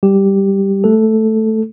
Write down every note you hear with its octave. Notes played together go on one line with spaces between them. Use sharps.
G3 G4
A3 A4